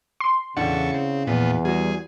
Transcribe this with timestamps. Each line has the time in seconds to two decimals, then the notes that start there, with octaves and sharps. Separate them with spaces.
0.20 C6
0.57 E2 C#3 D4 E4 A4 F#5 C#6
0.94 C4
1.27 E2 A#2 F3 B3
1.65 G3 F#4 G#4